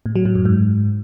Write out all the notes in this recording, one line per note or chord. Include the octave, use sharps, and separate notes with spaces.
A2
F#3
A2
F#2
G#2